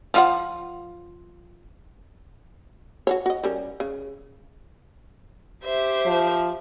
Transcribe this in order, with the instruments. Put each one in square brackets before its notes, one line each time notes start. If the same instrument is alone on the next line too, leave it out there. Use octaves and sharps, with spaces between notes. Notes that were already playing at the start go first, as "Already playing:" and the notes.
[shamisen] F3 F4 F#5
F#4 A4 C#5
F#4 D#5
G3 C#4 A#4
C#3
[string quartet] G4 C5 E5
[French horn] F3